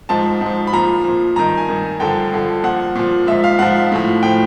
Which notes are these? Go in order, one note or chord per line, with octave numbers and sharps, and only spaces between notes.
G#2 F3 A5
G#2
F3
B5
A#2 F3 A#5
A#2 F3
G2 D#3 A#5
G#5
G2 D#3
G2 D3 F3 G5
G2 D3 F3
A#2 F3 F#5
A#2 F3
G#2 F3 E5
F5
G#2 F3 F#5
A2 F3
A2 F3 G5